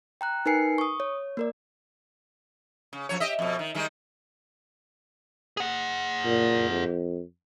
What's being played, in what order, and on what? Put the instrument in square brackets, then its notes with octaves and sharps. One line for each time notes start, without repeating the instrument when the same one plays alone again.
[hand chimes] G5 A#5 F#6
D#4 A#4 B4 G#5 C7 C#7
C#6 D#6
C#5
A#3 A#4 D5
[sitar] C#3
F#2 F3 C#5
G4 D#5 E5
F2 B2
D#3
D#3 G3 G#3
[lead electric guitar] G#4 F#5
[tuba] A#2
F2